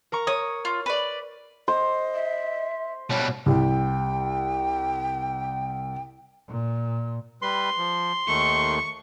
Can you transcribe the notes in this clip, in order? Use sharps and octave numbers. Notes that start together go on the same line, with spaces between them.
A#4 A#5 C#6
C#5 D#6
F4
B4 D5
C5 D#5
E5
B2 G3 C#5
C2 G5
A#2
G3 B4 C6
F3
D#2 D#3 A3 C#6